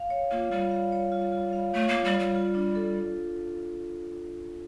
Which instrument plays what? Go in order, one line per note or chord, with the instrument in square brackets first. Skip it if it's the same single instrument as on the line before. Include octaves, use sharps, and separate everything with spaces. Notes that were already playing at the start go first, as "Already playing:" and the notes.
Already playing: [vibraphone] F5
C#5
[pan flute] A#3 [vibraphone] F4
[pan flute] G3 [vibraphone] F4
[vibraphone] F5
C#5
F4
F4
F5
[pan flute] A3 [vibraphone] C#5
[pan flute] A#3
[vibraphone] F4
[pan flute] G3
[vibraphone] F4
[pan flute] G3
[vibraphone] F4
D4
A4